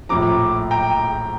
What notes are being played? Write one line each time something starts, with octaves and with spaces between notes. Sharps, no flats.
A#1 A2 F3 A#5 D6
G5 A#5